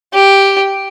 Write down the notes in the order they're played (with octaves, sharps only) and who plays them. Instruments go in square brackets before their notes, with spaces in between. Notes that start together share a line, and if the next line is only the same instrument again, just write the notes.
[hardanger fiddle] G4